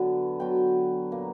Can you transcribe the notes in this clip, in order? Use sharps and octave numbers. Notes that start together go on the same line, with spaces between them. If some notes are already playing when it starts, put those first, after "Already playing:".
Already playing: D3 F#3 B3
D3 F#3 B3 G5
A#2 A#3